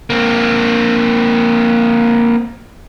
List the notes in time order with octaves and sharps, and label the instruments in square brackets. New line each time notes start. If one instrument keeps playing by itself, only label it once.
[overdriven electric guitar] A#3 C4